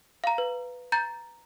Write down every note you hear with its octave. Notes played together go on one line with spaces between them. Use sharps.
F5 A#5
B4
A#5 G6 A6